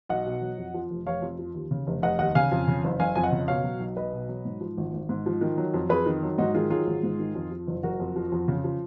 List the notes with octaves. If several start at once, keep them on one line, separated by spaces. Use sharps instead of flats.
B1 D#5 F#5
B2
F#3
F2
F3
F1
F1 C#5 F5
F2
F3
D#2
C#3
F1
F1 D#5 F#5
D#2 D#5 F#5
C#3 F5 G#5
F2
C#3
F#1
F#1 F5 G#5
F2 G#5
D#5 F#5
C#3
B2 C#5 F5
F#3
B1
B1 B4 D#5
B2
F#3
G#2
F3
G#1
G#1
G#2
F3
D#3
F#3
F2
F2 G#4 B4
D#3
F#3
G#2 D#4 F#4
D#3 F4 G#4
F#3 F4 G#4
G#1
G#2
D#3
F2
F3
F#1
F#1 F#4 A#4
F2
F3
F2
C#3
F3